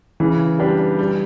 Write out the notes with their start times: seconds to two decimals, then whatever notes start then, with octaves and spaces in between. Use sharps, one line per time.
0.20 C#3 E3
0.59 G3 B3 D4 G4
0.99 G3